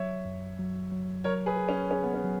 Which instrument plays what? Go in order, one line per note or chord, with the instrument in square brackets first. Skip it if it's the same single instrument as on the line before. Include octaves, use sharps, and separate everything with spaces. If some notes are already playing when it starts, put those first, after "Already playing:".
Already playing: [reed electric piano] F#3 [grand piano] C#5 E5
[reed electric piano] F#2
F#3
F#3
[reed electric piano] F#3 [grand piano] A#4 C#5
[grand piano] G#4 B4
[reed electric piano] G#4
[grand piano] C#4
[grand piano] C#4 [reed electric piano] G#4
[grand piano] B3
C#4
[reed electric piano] F#3